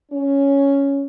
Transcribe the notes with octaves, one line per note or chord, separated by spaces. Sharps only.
C#4